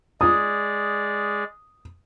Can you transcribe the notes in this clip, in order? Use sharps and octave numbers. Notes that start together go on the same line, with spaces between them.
G#3 G#4 D5 D#6